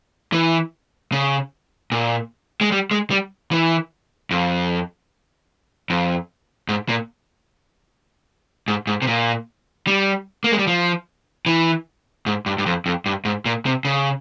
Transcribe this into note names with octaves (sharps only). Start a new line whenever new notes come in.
E3
C#3
A#2
G#3
G3
G#3
G3
E3
F2
F2
G#2
A#2
G#2
G#2
C3
A#2
G3
A#3
G#3
G3
F3
E3
G#2
G2
G2
F2
F2
G2
G#2
A#2
C3
C#3